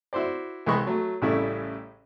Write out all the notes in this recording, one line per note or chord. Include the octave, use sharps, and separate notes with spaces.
E4 F#4 C5 D5
C2 E3 G#3 D#5 B5 C#6
F#3 A3
A1 A2 C#3 G3 A3 E4